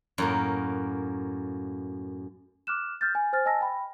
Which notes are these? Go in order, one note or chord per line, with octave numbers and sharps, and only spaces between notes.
F#2 A2 A#3
D6 F6 F#6 E7
F6 G6 A6
G#5
C5 G#5 F6 A6
D#5 G#5 A5 E6 A#6
G5 B5